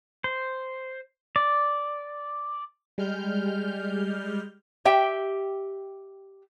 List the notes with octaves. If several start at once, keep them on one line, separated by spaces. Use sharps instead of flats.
C5
D5
G3 G#3 F6 G6
G4 E5 G5